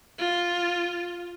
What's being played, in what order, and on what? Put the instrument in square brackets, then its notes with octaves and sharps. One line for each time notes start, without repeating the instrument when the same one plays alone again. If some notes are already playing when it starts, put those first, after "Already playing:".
[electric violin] F4